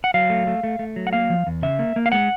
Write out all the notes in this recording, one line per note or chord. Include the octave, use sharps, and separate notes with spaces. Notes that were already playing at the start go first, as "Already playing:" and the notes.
F#5
F#3 F5
A3
A3
A3
A3
F#3
F#5
A#3 F5
F3
E2
C#3 E5
A#3
A#3
F5
G#3 F#5